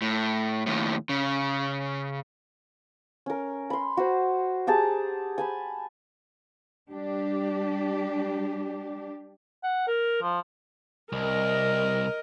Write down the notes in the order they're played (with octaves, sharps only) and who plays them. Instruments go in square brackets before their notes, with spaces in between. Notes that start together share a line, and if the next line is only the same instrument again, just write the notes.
[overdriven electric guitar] A2
D#2 A2
C#3
[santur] C#4 A#4
B5 C6
F#4 C5
G4 G#4 A5 A#5
G#5 A5 B5
[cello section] G3 D4 G4
[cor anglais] F#5
A#4
F3
[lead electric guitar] C2 [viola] A#4 D#5